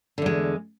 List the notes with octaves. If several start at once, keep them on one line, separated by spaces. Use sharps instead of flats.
E2 D3 G#3